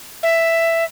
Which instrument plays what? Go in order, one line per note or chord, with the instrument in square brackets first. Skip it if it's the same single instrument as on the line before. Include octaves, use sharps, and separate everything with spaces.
[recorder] E5